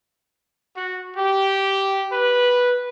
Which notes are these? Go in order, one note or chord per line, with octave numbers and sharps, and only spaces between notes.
F#4
G4
B4